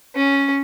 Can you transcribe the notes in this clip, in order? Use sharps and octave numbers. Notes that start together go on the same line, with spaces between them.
C#4